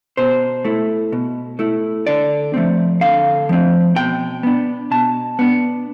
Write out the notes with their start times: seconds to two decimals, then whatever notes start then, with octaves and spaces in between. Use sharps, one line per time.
0.17 B2 C5
0.65 A3 E4
1.12 B2
1.59 A3 E4
2.07 D3 D5
2.54 F3 A3 C4
3.01 D3 F5
3.49 F3 A3 C4
3.96 B2 G5
4.43 B3 D4
4.91 B2 A5
5.39 B3 D4